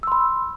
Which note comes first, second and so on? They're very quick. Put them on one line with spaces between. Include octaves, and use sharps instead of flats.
E6 C6 B5